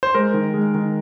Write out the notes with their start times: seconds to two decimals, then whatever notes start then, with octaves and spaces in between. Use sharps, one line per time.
0.03 C5
0.15 G#3 A#4
0.34 D#3
0.54 G#3
0.74 D#3